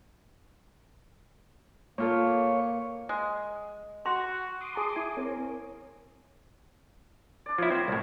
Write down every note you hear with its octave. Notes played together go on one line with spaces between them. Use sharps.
A#2 A#3 F4 A4 C#5
G#3
F#4 F#5 C6
C6 D6 D#6
G#4 A5 A#5
E4 G#5
C4 A#4 C#5
D4 D5
F3 A#3 B3 E4 C#5
C4 C5
C2 A2